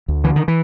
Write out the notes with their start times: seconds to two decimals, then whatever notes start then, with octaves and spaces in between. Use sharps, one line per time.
0.08 D2
0.24 D3 E3
0.36 D#3
0.48 E3